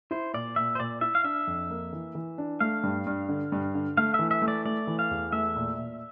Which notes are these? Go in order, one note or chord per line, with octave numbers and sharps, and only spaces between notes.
E4 C5
A#2 D5
A#2 E5
C5
A#2 D5
E4 E5
F5
D4 E5
F2
A#3
E3
E3
D4
A3 F5
G2
G2
D3
G2
D3
A3 F5
E3 E5
E5
A3
D5
A3 D5
E3
F5
E2
A3 E5
A#2
A#2